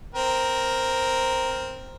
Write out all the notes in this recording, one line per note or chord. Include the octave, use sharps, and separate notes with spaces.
C4 A#4